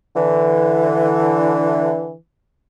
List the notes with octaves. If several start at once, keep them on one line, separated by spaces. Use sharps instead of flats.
D3 E3